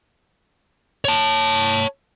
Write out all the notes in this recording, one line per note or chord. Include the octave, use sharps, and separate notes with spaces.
C#5 A5